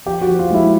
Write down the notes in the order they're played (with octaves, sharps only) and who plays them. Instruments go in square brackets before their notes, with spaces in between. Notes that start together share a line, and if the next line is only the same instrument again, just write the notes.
[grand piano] F3 G4
F#4
F3
F4
G#3 E4